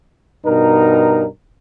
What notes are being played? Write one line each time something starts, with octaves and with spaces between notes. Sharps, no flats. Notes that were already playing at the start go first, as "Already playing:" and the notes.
G2 B2 D#4 A#4